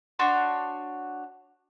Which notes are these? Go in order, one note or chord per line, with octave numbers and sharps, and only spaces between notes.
D4 F#4 C#5 C6